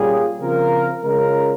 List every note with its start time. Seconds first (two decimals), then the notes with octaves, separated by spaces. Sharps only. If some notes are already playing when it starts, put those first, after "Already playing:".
Already playing: A#2 G3 C#4 F4 G#4
0.39 C#3 F3 C4 F4 A#4
1.03 C#3 G#3 C#4 F4 A#4